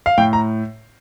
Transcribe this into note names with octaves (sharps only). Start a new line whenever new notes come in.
F5
A2 G5
A#5